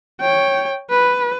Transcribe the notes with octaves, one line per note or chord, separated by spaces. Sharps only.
C#5 G5
B4